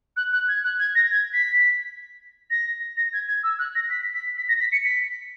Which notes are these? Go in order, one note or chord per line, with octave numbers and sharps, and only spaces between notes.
F#6
F#6
G#6
F#6
G#6
A#6
G#6
B6
A#6
A#6
G#6
G#6
E6
F#6
A#6
B6
B6
B6
A#6
B6
C#7
B6